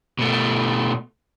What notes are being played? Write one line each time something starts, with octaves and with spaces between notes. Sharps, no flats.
B2 A3